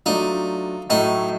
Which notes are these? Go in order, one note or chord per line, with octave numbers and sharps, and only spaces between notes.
F#3 A3 D4 D#4 F4
A2 F#3 A3 D#4